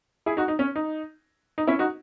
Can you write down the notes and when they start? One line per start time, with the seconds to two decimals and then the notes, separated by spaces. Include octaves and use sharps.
0.26 E4 G#4
0.37 D#4 F#4
0.48 D#4
0.59 C#4
0.76 D#4
1.58 D#4
1.67 C#4 E4
1.79 D#4 F#4